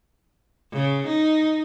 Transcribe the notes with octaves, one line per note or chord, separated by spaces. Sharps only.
C#3
D#4